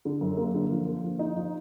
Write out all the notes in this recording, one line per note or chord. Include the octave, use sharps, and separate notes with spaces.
D3
F#2
A#3
D3
F3
A#3
F3
D#4
F3